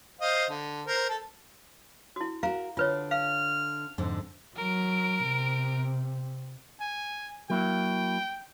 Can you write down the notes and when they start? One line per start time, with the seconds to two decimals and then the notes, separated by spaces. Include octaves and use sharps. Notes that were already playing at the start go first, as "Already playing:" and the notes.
0.21 C5 D#5 F5
0.49 D3
0.86 A#4 C5
1.09 A4 A5
2.16 E4 F#4
2.43 F#4 A#4 F5 A#5
2.77 D3 F4 B4 C#5
3.11 F5 F6
3.98 F2 G#2 D3
4.57 F#3 A#4 D7
5.26 C3
6.80 G#5
7.50 F#3 A#3 E4 G5